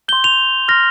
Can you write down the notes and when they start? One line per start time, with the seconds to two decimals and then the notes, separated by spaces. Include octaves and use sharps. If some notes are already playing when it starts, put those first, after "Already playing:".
0.08 C6 G6 G7
0.24 F7
0.68 C6 F6 A#6